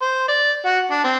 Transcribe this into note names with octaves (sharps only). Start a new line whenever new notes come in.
C5
D5
F#4
D4
C4